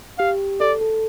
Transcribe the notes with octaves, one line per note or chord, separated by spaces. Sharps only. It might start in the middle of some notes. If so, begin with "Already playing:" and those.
G4 F5
A4 D5
A4